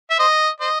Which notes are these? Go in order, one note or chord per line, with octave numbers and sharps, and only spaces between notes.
E5
C5 D#5
C5 D#5